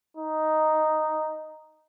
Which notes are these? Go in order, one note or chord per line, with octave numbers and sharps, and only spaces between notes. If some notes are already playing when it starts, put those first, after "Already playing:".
D#4